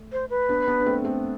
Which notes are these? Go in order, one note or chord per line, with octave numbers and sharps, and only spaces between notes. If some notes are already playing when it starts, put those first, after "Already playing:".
Already playing: A3
C5
B4
B3 D4
B3 D4
D4
A3 C4
A3 C4